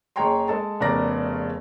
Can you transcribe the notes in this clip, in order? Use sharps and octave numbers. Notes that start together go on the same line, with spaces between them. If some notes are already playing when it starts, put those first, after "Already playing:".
F#1 G#4 C#5 G5 A#5 C6
G#3 A4 A5
F1 C#3 B3 A#4 D5 A#6